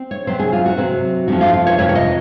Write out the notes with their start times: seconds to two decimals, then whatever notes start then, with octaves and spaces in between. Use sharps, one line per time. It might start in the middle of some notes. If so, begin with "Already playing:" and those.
Already playing: C4
0.11 C#5
0.27 C3 F#3 C4 C5
0.39 G#4
0.53 F4
0.66 F#4
0.77 C3 F#3 C4
1.28 F2 C3 F3 F#4
1.41 F4
1.53 F4
1.67 C#5
1.78 F2 C3 F3 C#5
1.89 C#5
1.95 D#5